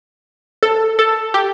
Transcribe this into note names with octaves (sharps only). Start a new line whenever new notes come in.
A4
A4
G4